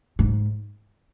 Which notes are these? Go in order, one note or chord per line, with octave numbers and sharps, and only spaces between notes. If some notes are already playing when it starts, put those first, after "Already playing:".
G#2